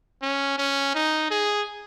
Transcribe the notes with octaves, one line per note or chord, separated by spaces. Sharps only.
C#4
C#4
D#4
G#4